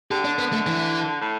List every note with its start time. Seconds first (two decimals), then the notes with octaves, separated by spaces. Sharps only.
0.11 D3 G4
0.25 D4
0.39 B3
0.53 A3
0.66 E3
1.21 A2